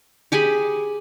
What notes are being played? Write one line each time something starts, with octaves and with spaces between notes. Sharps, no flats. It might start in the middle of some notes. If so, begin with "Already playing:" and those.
G4 G#4 G#5 B5